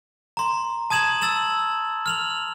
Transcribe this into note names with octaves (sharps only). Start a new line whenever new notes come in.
A#5 C6
A5 D#6 G#6 E7 F#7
E6 A6 E7 F#7
F6 F7 F#7